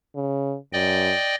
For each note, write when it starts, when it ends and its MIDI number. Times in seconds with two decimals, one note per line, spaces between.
0.15 0.56 49
0.73 1.13 42
0.73 1.35 74
0.73 1.35 75
0.73 1.35 79